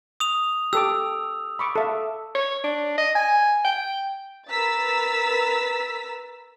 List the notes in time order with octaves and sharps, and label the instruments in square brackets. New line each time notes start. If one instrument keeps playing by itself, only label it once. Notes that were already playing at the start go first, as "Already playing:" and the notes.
[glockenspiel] D#6 F7
[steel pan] G4 A4 D6 [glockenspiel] E6
[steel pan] B5 C#6 D6
A4 E5 F5
[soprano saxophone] C#5
D4
D#5
G#5
G5
[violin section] A#4 B4 A#5 E6 A6 B6